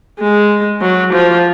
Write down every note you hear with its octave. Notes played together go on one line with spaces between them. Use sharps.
G#3
F#3
F3